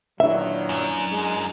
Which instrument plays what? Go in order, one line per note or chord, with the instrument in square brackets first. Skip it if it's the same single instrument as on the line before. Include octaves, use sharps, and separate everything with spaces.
[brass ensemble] A#2 D#3 F#3 [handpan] D4 E4 B4 [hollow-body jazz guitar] E5
[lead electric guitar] F#2
[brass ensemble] G#3